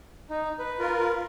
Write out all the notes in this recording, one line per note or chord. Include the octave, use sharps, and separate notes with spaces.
D#4
B4
F4 A#4